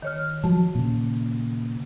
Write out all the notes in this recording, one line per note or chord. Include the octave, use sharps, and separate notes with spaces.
D#3 C#5 F6
F3 F#3 A5
A#2 C#3